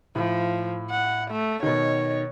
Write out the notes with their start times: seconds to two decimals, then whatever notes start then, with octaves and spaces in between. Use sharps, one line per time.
0.15 A2 F3
0.90 F#5
1.31 A3
1.63 B2 D#3 C#5